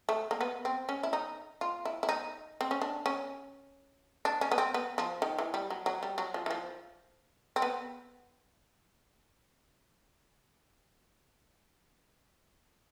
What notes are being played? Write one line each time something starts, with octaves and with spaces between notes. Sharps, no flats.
A3
A#3
B3
C4
C#4
E4
D#4
F4
E4
E4
D#4
C4
C#4
D4
C#4
D4
C#4
B3
C4
B3
F3
D#3
E3
G3
F#3
F#3
G3
F#3
F3
E3
F3
C4
B3